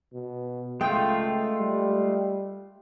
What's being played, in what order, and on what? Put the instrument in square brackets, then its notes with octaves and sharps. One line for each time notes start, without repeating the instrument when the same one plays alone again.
[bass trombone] B2
[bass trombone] C#2 [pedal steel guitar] G#3 A3 F4 [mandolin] G5
[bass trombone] G3